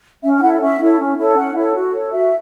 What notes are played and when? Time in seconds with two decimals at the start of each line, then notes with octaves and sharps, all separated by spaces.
0.23 C#4 E5
0.38 G#5
0.42 E4 A4 C#5 F#5
0.61 C#4 E5
0.80 E4 A4 C#5
0.99 C#4
1.18 E4 A4 C#5
1.37 C#4 F#5
1.55 E4 A4 C#5
1.74 F#4
1.93 A4 C#5
2.11 F#4 E5